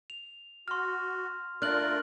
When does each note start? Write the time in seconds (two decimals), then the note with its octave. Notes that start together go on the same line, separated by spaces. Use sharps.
0.10 F7
0.68 F#4 C6 F6
1.62 A3 D4 F4 A#4 F6 F#6 F#7